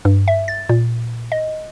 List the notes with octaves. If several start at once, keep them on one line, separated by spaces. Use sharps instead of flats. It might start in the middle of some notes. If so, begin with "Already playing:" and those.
G2
E5
A6
A#2
D#5